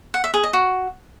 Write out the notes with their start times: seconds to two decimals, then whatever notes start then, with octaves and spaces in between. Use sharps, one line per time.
0.14 F#5
0.24 E5
0.34 G#4
0.43 D#5
0.53 F#4